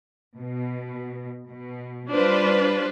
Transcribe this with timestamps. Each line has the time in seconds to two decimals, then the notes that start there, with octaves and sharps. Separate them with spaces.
0.37 B2
1.49 B2
2.13 G3 D4 F4 B4 C5